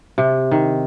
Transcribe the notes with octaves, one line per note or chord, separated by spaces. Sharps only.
C3
D#3